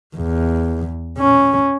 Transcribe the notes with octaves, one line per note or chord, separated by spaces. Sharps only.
E2
C#4